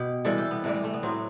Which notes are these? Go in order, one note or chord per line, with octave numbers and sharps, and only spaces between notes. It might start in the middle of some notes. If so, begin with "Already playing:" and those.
Already playing: B2 G4
C3 E3 G3 A4
G4
B3
C3 E3 G3 A3
G3
A3
B3
A2 F#3 C4